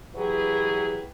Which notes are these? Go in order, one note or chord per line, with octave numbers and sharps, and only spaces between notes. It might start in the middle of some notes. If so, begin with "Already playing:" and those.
E3 F#3 G4 G#4 B4